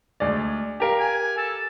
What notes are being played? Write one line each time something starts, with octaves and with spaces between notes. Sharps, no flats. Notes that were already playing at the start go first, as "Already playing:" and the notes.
D2 G#3 D5
G4 A#4 F5
G#5
A4